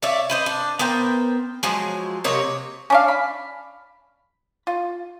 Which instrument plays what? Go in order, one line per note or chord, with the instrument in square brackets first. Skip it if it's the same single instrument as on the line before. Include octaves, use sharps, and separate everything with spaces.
[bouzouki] C#5 D5 E5
B4 C5 D#5
D4
B3 A#4 C5 G5
F3 F#3 G#3
C3 A#3 C#5 D#5
[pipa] C#4 D4 F5
B5
F4